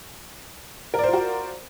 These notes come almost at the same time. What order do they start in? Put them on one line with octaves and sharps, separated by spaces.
A#4 D5 C5 F4 F#4